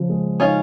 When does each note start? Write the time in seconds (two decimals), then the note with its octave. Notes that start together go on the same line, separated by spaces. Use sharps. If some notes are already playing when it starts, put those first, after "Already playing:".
Already playing: C#3 F3
0.09 G#3
0.40 C#4 D#4 F4